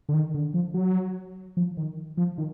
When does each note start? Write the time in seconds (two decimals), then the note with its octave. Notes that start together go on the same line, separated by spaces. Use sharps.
0.09 D3
0.14 D#3
0.34 D3
0.54 F3
0.74 F#3
1.57 F3
1.77 D#3
2.17 F3
2.38 D#3